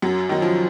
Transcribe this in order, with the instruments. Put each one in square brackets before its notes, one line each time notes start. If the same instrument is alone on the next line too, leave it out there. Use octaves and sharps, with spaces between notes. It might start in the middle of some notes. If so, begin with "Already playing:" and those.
[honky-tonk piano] F#2 F#3
D#3 F#3
F3